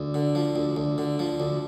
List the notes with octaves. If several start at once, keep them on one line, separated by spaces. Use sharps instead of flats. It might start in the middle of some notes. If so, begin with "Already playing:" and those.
Already playing: D2
D3
F3
D2
D2
D3
F3
D2